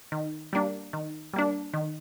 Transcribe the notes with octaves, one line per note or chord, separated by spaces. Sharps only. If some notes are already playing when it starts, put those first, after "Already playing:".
D#3
G3 A#3 D4
D#3
G3 A#3 D4
D#3